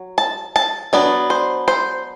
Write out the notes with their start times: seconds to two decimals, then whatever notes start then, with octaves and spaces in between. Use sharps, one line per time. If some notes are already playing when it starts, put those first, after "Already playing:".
Already playing: F#3
0.18 A5
0.56 A5
0.93 F#3 B3 D4 D5
1.30 C5
1.68 C5